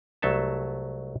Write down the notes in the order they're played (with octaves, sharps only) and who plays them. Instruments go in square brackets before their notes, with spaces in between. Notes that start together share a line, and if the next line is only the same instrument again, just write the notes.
[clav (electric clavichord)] C2 F#3 A3 A4 E5 A5